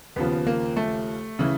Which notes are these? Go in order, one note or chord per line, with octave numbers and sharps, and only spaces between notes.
D#2 C#3 F3 B3
A#3
A3
C#3 E3